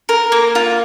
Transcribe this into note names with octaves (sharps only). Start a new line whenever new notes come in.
A#4
A#3
F4